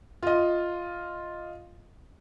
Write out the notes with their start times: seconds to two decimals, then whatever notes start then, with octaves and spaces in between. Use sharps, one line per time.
0.23 F4 D#5